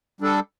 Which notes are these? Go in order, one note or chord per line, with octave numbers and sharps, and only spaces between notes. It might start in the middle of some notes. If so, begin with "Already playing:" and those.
G3 D4 A4